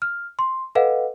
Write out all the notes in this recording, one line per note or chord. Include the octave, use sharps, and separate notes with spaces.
F6
C6
A4 B4 D#5 F5 F#5